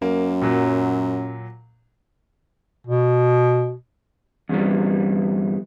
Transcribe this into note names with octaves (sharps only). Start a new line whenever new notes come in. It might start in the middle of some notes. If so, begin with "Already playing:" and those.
F#2 A#3
A#2 F#3
B2
E2 G2 E3 G3